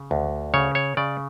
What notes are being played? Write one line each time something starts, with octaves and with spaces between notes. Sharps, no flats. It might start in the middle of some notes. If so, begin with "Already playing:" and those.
Already playing: C#3
D2
C#3 C#5
C#5
C#3 D5